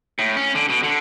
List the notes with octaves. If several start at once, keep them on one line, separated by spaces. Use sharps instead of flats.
A2
C#4
D3
B2
D3